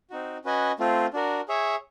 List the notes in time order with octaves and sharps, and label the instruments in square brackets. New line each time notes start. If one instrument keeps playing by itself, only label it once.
[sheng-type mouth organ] C4 D#4 F#4
C#4 F#4 B4 D#5 G#5
A3 C4 F4
D4 F#4 A#4
G#4 C#5 E5